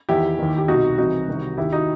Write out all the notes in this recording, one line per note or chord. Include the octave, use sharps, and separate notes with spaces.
E2 D#3 E4 G4
D#2 D#3
G4
C2 B2 D#4 F#4
C2 C3 E3 D#4 F#4
C2 C3 D#3
D#2 D#3 E4 G4
D#4 F#4